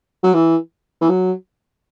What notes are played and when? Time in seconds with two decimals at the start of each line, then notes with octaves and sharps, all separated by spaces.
0.23 F#3
0.34 E3
1.01 E3
1.09 F#3